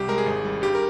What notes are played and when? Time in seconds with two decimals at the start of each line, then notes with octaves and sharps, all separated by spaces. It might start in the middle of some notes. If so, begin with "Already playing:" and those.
Already playing: C2 G3 G4
0.08 G#3 A#4
0.18 G#4
0.26 G#1
0.45 G3
0.62 G2 G4
0.75 A#4